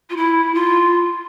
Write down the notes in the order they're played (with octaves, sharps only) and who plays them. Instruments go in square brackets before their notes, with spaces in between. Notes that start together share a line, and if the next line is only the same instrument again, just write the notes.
[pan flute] F4
E4
F4